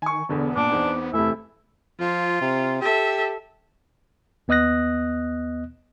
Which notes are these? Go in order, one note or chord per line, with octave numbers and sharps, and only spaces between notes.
D#3 G#5 C#6
E1 E2 D3 B3
A#2 D4 A5 D6
E2 C4 D#4
E2 C3 E3 A3 E4
F3 F4
C3
G4 A4 E5
D#2 B3 D#5 D#6 F#6 A#6